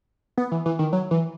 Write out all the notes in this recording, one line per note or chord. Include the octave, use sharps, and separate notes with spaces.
B3
E3
E3
D#3
F#3
E3